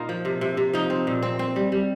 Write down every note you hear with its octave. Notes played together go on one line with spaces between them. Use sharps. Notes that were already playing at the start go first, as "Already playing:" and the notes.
Already playing: A#2 A#3 D#4 F4
F3
C3
C3
C3
F3 D#4
C4
A#2
C4
C4
G3
G3